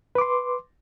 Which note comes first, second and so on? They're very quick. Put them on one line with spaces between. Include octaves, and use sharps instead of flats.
B4 D6 C6